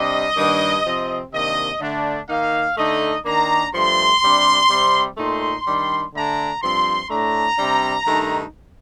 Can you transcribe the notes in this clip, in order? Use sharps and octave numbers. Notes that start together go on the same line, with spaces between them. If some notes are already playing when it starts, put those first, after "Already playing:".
Already playing: C3 G3 D4 D#5
G2 D#3 G3 A#3 D4
C3 F3 C4
C3 D#3 A#3 D4 D#5
D3 A3 D4
D#3 A#3 D#4 F5
D3 A3 D#4 D#5
D#3 A#3 D4 A#5
G2 F3 A3 C6
C3 G3 D4
C3 G3 C4
A#2 A3 D#4 C6
D#3 G3 D4
D3 A3 D4 A#5
G2 F3 C4 C6
A2 A3 D4 A#5
C3 G3 D4
G2 D#3 A3 D#4